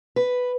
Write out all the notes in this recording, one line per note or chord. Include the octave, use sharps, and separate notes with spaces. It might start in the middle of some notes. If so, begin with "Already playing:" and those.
B4